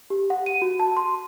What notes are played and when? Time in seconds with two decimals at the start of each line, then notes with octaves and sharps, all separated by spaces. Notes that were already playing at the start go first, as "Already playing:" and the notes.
0.10 G4
0.30 F#5
0.46 D#7
0.62 F#4
0.79 A5
0.97 C6